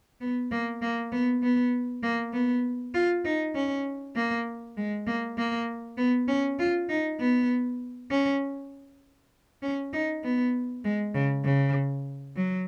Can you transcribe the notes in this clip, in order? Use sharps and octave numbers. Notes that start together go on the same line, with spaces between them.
B3
A#3
A#3
B3
B3
A#3
B3
F4
D#4
C#4
A#3
G#3
A#3
A#3
B3
C#4
F4
D#4
B3
C#4
C#4
D#4
B3
G#3
C#3
C#3
F#3